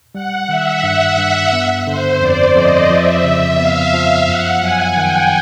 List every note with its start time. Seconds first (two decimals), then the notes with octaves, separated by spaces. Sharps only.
0.14 G3 F#5
0.48 D#3 E5
0.83 G2
1.18 G2
1.53 B3
1.86 D3 C5
2.21 F2 D5
2.55 F2 D#5
2.90 F3 E5
3.24 C#3
3.59 B3 F5
3.94 F3
4.28 F#2 F#5
4.62 F#3 G#5
4.97 D#3 G5